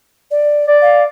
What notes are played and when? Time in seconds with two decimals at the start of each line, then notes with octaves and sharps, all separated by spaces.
0.31 D5
0.67 D5
0.82 F5